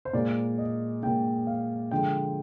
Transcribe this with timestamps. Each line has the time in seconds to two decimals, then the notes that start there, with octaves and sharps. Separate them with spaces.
0.05 C5
0.13 A#2 G#3 D5
0.58 D#5
1.02 A#2 G#3 G5
1.47 F5
1.91 D3 F3 G#3 G5